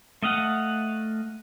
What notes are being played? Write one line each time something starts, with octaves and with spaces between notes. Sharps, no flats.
A3 D#5 F5 F#5